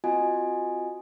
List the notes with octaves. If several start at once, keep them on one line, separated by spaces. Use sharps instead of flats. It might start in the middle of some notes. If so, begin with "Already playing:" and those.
C4 F4 F#4 D#5 G#5